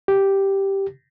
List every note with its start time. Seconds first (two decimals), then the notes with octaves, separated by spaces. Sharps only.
0.08 G4